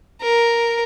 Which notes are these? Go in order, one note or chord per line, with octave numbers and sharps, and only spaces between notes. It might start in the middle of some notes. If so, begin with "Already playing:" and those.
A#4